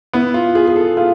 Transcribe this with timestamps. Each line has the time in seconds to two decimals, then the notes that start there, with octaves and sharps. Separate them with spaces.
0.13 B3 E4
0.34 F4
0.55 F4 G#4
0.67 G#4
0.76 A4
0.97 F4 G#4